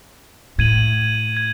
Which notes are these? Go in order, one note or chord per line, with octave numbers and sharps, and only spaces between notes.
A2 G#6 D#7 F#7
G#6